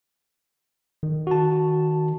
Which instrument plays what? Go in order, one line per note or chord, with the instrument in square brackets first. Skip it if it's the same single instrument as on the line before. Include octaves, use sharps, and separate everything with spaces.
[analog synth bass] D#3
[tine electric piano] F#4 A5